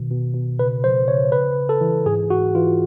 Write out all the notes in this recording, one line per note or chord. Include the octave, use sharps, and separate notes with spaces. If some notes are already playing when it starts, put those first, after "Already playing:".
Already playing: B2 D#3
B2
B2
C#3 B4
F3 C5
C#3 C#5
C#3 B4
C#3
A4
E3
G#2 G#4
G#2 F#4
E3 F4